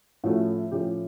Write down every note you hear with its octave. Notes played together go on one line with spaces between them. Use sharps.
A2 F3 A3 C#4 F#4
A2 F3 A3 C#4 G4